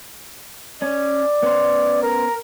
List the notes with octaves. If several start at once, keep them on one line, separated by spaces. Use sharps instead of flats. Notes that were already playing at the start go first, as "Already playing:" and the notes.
C#4 D5
B3 C#4 C5
A#4